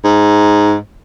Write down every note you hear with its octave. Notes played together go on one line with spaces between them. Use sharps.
G#2